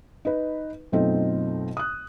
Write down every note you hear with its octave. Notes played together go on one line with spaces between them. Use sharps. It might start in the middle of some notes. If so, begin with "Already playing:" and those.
D#4 B4
F#2 B2 A3 C4 D#4 F4
D#6 F#6